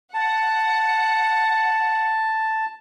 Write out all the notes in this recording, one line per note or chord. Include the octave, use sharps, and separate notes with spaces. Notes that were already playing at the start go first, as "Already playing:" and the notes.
F#5 A5